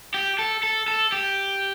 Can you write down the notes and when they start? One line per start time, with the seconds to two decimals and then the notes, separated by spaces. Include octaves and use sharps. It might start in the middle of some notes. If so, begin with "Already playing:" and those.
0.14 G4
0.39 A4
0.63 A4
0.88 A4
1.12 G4